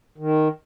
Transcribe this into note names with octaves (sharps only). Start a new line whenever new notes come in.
D#3